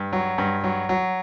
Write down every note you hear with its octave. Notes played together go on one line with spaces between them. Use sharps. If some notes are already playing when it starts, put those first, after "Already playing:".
Already playing: G2
F#3
G2
F#3
F#3